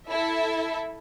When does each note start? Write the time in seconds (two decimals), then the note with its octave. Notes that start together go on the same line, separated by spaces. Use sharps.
0.10 E4 A4 E5